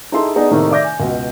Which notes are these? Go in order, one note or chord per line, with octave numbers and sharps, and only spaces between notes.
D#4 E4 G#4 A4 C6
B3 D4 D#4 G#4
A2 C3 D#3 A3 A#3 D#4
D5 E5 D6 G6 A#6
G#5
C#2 B2